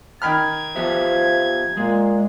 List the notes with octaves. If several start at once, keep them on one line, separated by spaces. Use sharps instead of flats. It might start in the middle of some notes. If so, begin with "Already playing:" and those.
D#3 B5 F6 G#6
F3 B3 G4 E5
A#2 G#3